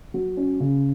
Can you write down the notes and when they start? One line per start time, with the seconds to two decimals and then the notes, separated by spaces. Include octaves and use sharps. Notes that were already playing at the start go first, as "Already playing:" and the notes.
0.14 F#3
0.37 C#4
0.60 C#3